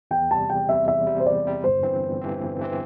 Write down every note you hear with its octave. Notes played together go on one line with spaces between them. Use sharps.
E2 G5
C3 G3 A5
E2 G5
C3 G3 E5
E2 E5
C3 G3
C5
E2 D5
C3 G3
G1 C5
G2 E3 C4
G1
G2 E3 C4
G1
G2 E3 C4